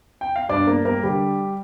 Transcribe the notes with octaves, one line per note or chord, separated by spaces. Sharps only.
G5
F5
G2 D4 D5
G2 A#3 A#4
G3 A#3 A#4
D3 G3 G4